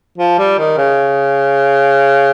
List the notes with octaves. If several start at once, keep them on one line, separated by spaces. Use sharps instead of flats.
F3
G3
D#3
C#3